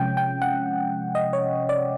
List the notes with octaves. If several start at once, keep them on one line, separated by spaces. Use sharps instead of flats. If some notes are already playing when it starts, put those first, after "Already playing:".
Already playing: C3 F3 G#3 C#4 G5
G5
F#5
D#5
C#5
D5